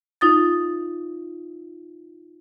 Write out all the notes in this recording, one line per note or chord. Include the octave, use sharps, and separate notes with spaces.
D#4 F4 D#6 A6